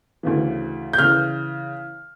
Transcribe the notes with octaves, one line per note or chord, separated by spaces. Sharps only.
D2 C#3 E3
G6
C#3 E3 F6